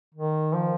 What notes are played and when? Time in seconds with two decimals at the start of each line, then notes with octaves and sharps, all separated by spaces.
0.14 D#3
0.53 F3